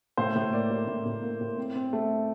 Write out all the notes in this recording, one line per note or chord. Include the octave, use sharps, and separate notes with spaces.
A2 C5
A2
A#3 D5
A2
A2
A2
A#3
A2
C4
C4
A3